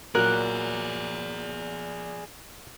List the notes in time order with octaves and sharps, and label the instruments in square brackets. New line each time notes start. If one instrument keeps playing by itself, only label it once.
[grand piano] A#2 F#3 [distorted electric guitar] G#4 D5 [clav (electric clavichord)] A#4 [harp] F#6